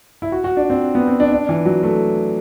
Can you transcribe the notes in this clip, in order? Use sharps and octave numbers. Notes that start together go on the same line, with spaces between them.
E4
F#4
F#4
D4
C4
B3
C4
D4
D4
E3
F#3
A3